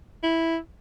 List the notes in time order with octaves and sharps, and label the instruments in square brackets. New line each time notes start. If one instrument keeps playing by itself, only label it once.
[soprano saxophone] E4